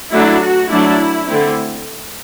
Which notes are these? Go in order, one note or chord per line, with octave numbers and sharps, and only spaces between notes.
F#3 A3 D4 E4
F#4
F#3 A3 D4 E4
D3 A3 C4 E4